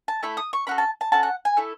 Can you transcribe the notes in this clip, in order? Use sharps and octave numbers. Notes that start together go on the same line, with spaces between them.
A5
A3 E4 A4 B5
D#6
C#6
C#4 F#4 A4 B5
A5
A5
C#4 F#4 A4 A5
F#5
G#5
A3 E4 A4